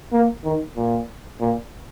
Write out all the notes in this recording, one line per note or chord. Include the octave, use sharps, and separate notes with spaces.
A#3
D#3
A#2
A#2